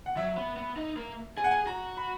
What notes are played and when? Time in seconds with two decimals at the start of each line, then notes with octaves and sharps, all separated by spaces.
0.06 F#5
0.17 F#3 E5
0.37 B3
0.57 B3
0.77 D#4
0.97 A#3
1.37 G#4 G#5
1.44 F#5
1.51 G#5
1.66 F#4 A#5
1.97 B5